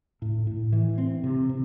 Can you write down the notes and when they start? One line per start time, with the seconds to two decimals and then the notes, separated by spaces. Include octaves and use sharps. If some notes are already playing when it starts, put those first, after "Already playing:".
0.22 A2
0.47 A2
0.73 E3
0.98 C4
1.24 C3
1.49 C3